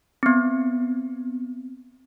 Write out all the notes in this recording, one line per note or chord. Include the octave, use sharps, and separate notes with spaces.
B3 C4